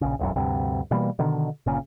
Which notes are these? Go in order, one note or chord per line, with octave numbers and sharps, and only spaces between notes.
A#1 C#3
E1 B1 F#2
D2 G2 C3
B2 E3 G3 A#3
B2 D3 D#3
G1 A#2 C#3